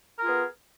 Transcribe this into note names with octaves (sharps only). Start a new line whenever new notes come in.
B3 F4 G#4 A#4